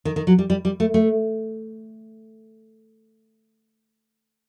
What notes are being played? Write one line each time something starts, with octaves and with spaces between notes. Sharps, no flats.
D#3
D#3
F#3
G3
G3
G3
A3
A3